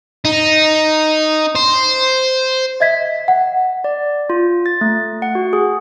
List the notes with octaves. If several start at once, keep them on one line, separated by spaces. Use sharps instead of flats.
D#4
C5
D#5 E5 G#6 B6
F#5
D5
F4
A6
A3
F#5
F#4
G#4